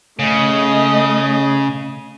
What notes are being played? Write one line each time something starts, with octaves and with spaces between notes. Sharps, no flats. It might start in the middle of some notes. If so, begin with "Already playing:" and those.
C#3 A3 D#5